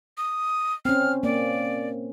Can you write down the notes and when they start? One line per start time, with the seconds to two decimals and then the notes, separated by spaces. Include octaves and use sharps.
0.18 D#6
0.85 C4 C#4 F6
1.23 A#3 D5